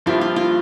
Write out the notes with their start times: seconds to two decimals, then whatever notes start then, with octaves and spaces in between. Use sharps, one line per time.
0.06 G2 F3 A#3 E4 F4 G4
0.21 F4
0.36 F4